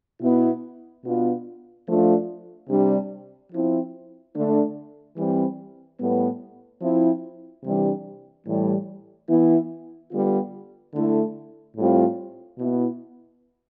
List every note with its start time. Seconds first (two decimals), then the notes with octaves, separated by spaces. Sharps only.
0.22 B2 B3 E4
1.05 B2 B3 D4 F4
1.87 F3 A3 D4 F4
2.69 C3 G3 D4
3.52 F3 C4 E4
4.34 D3 A3 D4
5.17 E3 G3 C4
5.99 A2 G3 B3
6.81 F3 C4 E4
7.63 C3 E3 G3 D4
8.46 A2 E3 G3
9.28 E3 B3 E4
10.11 D3 G3 B3 F4
10.94 D3 A3 E4
11.76 A2 G3 C4 F4
12.58 B2 B3 E4